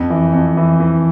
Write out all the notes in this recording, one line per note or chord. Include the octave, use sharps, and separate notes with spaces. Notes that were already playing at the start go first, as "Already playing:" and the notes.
Already playing: F2
E3
F2
E3
E3